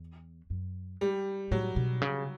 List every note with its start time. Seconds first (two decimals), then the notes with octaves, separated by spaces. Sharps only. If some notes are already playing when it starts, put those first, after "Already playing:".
Already playing: E2
0.50 F#2
1.01 G3
1.51 A2 F#3
1.76 B2
2.02 C#3